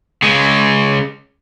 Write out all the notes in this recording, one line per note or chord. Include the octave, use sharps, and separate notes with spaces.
C#3 G#3